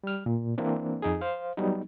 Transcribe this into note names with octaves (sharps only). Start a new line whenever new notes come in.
G3 F6
A#2
E3 A#3 C4 D4
F2 D#4 G#4
C5 F5
F#3 G3 B3 D#4